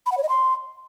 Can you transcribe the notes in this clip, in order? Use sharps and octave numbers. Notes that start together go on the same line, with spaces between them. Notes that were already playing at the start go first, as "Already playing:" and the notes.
B5
F#5
C#5
D#5
C6